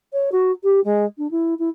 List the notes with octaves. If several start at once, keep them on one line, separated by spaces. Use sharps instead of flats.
C#5
F#4
G4
G#3
D4
E4
E4